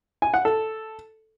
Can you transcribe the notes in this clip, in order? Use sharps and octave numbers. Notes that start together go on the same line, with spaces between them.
G#5
F#5
A4